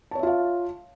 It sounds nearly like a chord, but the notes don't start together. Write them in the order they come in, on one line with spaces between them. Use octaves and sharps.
A5 C#5 E5 F4 F5